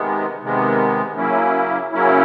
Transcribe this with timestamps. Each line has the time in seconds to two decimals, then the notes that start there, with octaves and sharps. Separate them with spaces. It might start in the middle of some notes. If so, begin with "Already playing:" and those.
Already playing: C3 D#3 G#3 B3
0.42 C3 D#3 G#3 B3
1.17 C#3 F#3 A#3 C#4 E4
1.92 C#3 F#3 A#3 C#4 E4